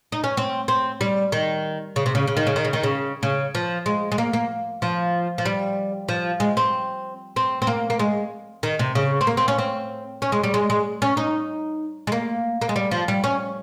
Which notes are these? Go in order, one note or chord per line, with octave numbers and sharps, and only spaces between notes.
D#4
C#4
C4
C4
G3
D#3
C#3
C3
C#3
C#3
D#3
C#3
D#3
C#3
D#3
C#3
C#3
F3
G#3
G#3
A#3
A#3
F3
F3
G3
F3
G#3
C4
C4
C4
A#3
A#3
G#3
D#3
C3
C#3
C4
A#3
C4
C#4
C4
C#4
G#3
G3
G#3
G#3
C#4
D#4
G#3
A#3
A#3
G#3
G3
F3
G3
C#4